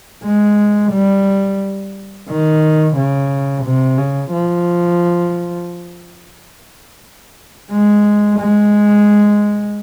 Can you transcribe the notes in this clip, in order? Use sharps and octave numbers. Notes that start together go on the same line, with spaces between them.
G#3
G3
D#3
C#3
C3
C#3
F3
G#3
G#3